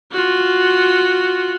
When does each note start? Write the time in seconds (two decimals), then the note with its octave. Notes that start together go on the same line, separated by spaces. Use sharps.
0.12 F4 F#4